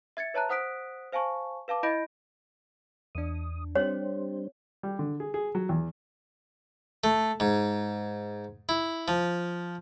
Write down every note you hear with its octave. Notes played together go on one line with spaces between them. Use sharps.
E5 G#6 A6 C#7
B4 C#5 E5 A5 A#5 F#6
C5 F#5 D#6 F#6 B6 D7
C5 F5 G#5 A5 C#6
B4 F5 A5 D6
E4 D#5 B5 G6 A#6 D7
E2 D4 D#6
G3 C4 D4 G4 C5 C#5
G3
D3
G#4
G#4
F#3
E2
A3
G#2
E4
F3